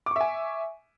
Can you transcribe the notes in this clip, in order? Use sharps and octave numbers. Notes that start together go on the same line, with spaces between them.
E5 G#5 C#6 D6